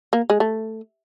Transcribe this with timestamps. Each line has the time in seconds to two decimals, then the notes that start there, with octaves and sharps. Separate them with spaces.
0.13 A#3
0.30 G#3
0.40 A3